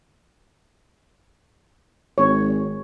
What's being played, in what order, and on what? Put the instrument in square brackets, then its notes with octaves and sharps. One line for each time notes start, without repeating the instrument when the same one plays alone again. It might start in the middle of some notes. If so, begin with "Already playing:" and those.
[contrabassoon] G#1 [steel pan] C#5